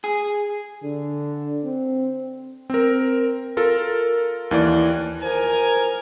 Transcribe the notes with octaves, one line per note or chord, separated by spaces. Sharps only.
G#4
D3
C4
C4 A#4
F4 A4 A#4
D#2 E3 D5
F3 A#4 G#5